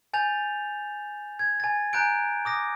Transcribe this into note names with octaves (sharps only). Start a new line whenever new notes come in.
G#5 G6 A6 F7
G#6
G#5 A6
G#5 A#5 F#6 G6 D7
D6 D#6 A#6